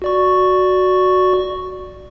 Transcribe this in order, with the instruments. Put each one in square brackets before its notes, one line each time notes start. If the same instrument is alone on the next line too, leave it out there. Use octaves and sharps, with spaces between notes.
[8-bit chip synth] F#4 D5 C#6